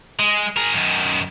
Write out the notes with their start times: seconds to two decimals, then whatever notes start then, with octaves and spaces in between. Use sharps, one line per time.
0.19 G#3
0.56 G#4 A#4
0.73 F#2 D#3